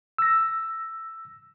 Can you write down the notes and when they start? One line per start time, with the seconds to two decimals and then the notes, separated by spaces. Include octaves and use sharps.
0.18 E6 A#6